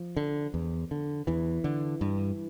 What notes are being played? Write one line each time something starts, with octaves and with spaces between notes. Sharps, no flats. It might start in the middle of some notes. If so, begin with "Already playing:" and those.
Already playing: F3
D3
E2
D3
E2 E3
D3
G2